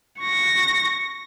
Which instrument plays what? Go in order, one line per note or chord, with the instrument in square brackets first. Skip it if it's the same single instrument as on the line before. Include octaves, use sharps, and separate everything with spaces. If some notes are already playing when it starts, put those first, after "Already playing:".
[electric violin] C#6 A#6